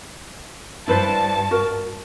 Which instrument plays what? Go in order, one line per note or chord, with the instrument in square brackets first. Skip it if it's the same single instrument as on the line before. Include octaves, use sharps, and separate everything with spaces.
[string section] G2 A5 [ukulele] E4 B4 C5
[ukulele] F#4 A#4